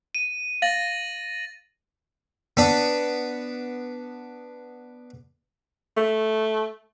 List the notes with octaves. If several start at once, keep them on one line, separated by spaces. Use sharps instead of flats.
D#7
F5 A6 A#6 F#7
B3 D4
A3